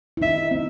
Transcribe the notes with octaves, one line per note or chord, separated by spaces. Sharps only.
E4
D#4 E5
C4